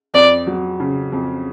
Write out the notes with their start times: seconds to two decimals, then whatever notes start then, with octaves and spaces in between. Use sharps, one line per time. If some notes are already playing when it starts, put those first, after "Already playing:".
0.14 F2 D5
0.47 F#3
0.80 C#3
1.12 F2